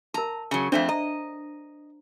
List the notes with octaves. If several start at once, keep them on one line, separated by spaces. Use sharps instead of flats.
A#4 A5 A#5
C#3 F#3
F2 A3 C4 D4 C5 D5
D#5 A#5